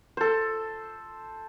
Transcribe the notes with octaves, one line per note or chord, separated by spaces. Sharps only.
A4 C5